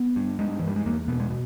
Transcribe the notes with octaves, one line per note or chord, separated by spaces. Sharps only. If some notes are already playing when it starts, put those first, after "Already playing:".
Already playing: B3
G2
G2 G#3
G2 E3
G3
G#3
E2 A#3
B2 B3
G#3
B2